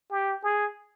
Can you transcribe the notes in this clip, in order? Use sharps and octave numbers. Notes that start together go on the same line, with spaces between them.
G4
G#4